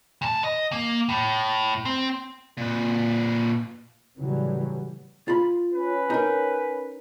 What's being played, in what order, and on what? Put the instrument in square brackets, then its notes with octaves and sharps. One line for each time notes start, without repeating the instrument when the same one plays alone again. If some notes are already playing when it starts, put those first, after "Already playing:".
[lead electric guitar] A#2 A5
D#5
A#3
A2
C4
A#2 B4
[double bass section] A2 C#3 E3 F#3 G3
[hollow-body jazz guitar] F4 B5
[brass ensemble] C#4 B4
[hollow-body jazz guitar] D#4 A#4